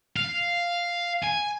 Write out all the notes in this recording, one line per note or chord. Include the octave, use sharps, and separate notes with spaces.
F5
G#5